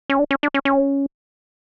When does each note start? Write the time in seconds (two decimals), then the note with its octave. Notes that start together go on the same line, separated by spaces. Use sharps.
0.10 C#4
0.19 D4
0.31 C#4
0.43 D4
0.54 C#4
0.65 C#4